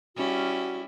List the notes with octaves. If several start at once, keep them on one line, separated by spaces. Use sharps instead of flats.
G3 C#4 E4 F#4